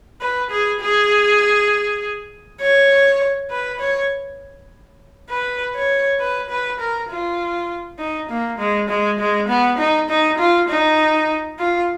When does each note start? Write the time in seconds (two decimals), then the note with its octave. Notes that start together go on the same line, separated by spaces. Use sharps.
0.21 B4
0.50 G#4
0.80 G#4
2.60 C#5
3.51 B4
3.80 C#5
5.30 B4
5.75 C#5
6.20 B4
6.49 B4
6.79 A#4
7.09 F4
7.99 D#4
8.29 A#3
8.59 G#3
8.89 G#3
9.19 G#3
9.48 B3
9.78 D#4
10.09 D#4
10.39 F4
10.69 D#4
11.59 F4